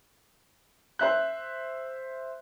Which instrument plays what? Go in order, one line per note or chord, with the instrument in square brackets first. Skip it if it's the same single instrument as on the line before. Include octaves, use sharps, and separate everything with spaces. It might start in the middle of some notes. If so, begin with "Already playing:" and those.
[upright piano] C5 E5 F#6